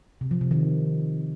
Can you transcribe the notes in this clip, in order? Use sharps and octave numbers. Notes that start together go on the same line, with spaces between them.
C3
F3
C3
D#3